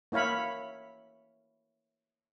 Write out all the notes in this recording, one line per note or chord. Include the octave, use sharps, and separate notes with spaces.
A#3 E4 C#5 F5 B5